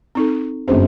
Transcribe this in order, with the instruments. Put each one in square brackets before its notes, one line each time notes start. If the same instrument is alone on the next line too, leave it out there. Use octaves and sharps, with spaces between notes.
[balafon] C4 D#4 A4
[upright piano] G1 F#2 C5 [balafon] C4 C#4 G#4